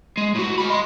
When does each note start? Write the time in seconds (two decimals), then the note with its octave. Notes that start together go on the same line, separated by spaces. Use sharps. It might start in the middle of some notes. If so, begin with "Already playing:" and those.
0.17 G#3
0.35 A2 F#4
0.58 G#3 B5
0.70 D#5 C6